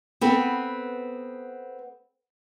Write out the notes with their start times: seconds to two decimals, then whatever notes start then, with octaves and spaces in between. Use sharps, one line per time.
0.21 B3 C4 A4 B4